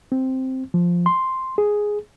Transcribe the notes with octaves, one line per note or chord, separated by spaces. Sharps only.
C4
F3
C6
G#4